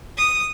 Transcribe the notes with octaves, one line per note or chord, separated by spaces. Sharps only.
D#6